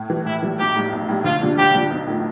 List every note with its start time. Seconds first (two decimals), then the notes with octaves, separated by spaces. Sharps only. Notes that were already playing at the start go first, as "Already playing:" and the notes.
Already playing: A2
0.10 E3 G3
0.26 A2 E4
0.42 E3 G3
0.59 B1 G4
0.76 A2 G3
0.92 B1
1.09 A2 G3
1.24 D2 F4
1.41 D3 G3 D4 F4
1.58 D2 G4
1.74 D3 G3 D4 F4
1.90 B1
2.07 A2 F3 A3